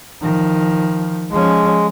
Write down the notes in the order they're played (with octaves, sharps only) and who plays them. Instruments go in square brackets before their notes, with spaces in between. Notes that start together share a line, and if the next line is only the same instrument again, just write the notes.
[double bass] D#3 F3
[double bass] F3 C#4 [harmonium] G#3